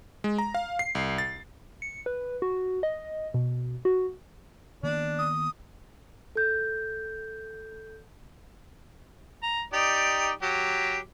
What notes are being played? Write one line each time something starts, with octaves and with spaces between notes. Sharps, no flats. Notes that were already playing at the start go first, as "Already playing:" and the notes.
G#3
A#5
F5
C7
C2
A6
C#7
B4
F#4
D#5
B2
F#4
D#3 A#3 B3 D4
D#6
A4 G6
A#5
D#4 G4 D5
F#3 G4